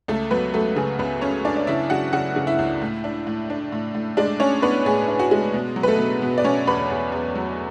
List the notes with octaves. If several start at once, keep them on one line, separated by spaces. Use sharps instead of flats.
C#2 A3 A4
F#3 B3 B4
F#3 A3 A4
C#3 G#4
C#2 B3 B4
C#4 C#5
C#4 D4 D5
D5
C#3 E4 E5
C#3 F#4 F#5
C#3 F#4 F#5
C#3
E4 E5
C#2
A2
D4
A2
D4
A2
A2
G#3 D4 D5
C#4 D4 C#5
B3 D4 B4
A2 G#4
D4
F#4
G#3
B2
F#3
B4
A3 A4
B2
B2
D5
B2 C#4 C#5
E2 B4 B5
E2
E2
F#3